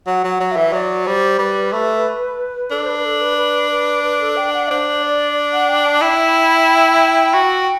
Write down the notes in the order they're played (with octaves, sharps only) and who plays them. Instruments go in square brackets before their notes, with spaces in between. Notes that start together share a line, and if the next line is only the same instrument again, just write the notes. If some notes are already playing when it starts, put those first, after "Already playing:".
[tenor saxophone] F#3 [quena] F#5
[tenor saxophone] F#3 [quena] F#5
[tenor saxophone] F#3
[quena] E5
[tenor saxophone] E3
[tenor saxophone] F#3 [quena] D5
[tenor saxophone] G3 [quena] C5
[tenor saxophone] G3 [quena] B4
[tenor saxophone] A3
[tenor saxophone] D4 [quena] A4
[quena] C5
B4
B4
A4
B4
B4
B4
B4
A4
G5
F#5
[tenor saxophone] D4 [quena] C5
[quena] D5
F#5
G5
A5
[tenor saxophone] E4 [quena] G5
[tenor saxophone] F#4